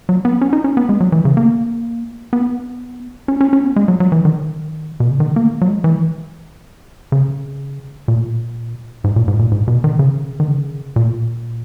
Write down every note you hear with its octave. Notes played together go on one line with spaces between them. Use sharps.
F#3
B3
C#4
D#4
C#4
B3
G#3
F#3
E3
C#3
A#3
B3
C#4
C#4
C#4
B3
G#3
F#3
F#3
E3
D#3
B2
C#3
D#3
A#3
F#3
G#3
E3
C#3
A#2
G#2
A#2
G#2
A#2
G#2
B2
D#3
C#3
D#3
C#3
A#2